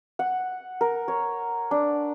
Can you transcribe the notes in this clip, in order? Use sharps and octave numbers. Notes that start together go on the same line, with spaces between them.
F#5
A#4
C#5
D4